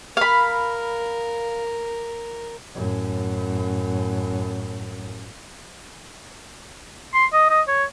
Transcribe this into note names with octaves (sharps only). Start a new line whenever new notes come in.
A#4 F5 B5
F#2 A2
C6
D#5
D#5
C#5